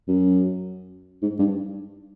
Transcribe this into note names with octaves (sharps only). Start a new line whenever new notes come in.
F#2
G#2
G2